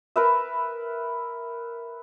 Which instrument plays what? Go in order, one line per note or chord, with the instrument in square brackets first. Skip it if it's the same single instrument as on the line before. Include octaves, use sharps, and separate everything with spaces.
[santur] A#4 B4 E5